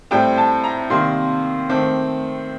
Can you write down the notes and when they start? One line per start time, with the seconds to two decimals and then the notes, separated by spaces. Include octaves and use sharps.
0.11 A2 G3 C4 G5
0.38 A5
0.64 A#5
0.90 C3 D#3 G3 A#3 C6
1.69 D#3 A3 C4 D6